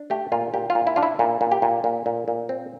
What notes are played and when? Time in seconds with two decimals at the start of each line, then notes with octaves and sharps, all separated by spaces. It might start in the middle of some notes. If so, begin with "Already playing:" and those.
Already playing: D4
0.10 A3 G4
0.32 A#2 F4
0.54 A#2 G4
0.70 F4
0.75 A#2
0.87 E4
0.96 D4 F4
1.03 E4
1.19 A#2
1.41 A#2
1.52 G4
1.62 A#2
1.84 A#2
2.06 A#2
2.28 A#2
2.49 C4